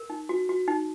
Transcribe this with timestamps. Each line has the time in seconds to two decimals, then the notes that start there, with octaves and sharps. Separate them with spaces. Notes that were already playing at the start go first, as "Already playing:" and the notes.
Already playing: A#4
0.10 D#4
0.29 F#4
0.49 F#4
0.68 D#4